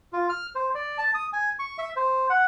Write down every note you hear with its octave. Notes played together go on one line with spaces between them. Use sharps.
F4
F6
C5
D5
A5
D#6
G#5
C#6
E5
C5
F#5